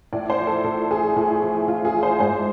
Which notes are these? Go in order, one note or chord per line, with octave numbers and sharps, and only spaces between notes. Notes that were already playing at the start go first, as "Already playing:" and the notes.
A2 D5
C5
F3
A4
A2 A4
F3 G#4
A2
F3
A2 F4
G#4
F3
C5
G#2 C5